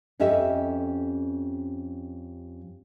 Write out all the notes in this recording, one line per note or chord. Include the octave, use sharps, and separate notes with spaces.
F2 C#4 G4 A4 D#5 E5